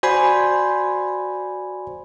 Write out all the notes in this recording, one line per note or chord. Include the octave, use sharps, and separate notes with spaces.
F#4 C5 D5 G#5 B5 C6